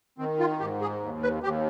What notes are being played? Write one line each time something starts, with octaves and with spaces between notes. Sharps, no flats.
D#3 C4
F4
G#2 G4
G#4
D#2
B4
D#2 G4